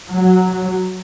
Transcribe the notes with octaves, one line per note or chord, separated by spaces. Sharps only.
F#3